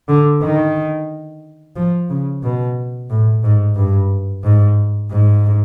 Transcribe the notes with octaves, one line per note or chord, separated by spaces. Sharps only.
D3
D#3
F3
C#3
B2
A2
G#2
G2
G#2
G#2